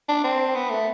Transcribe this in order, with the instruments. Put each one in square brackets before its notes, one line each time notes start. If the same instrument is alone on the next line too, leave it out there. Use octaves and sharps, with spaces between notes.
[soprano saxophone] D4
C4
B3
A3